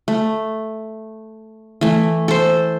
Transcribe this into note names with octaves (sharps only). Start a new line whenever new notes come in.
A3
E3 A3
A4 C5